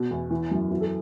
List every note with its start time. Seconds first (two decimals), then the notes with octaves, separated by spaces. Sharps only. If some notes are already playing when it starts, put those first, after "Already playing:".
Already playing: B2
0.11 E2
0.31 E3
0.51 F#2
0.71 E3 F#4
0.81 A4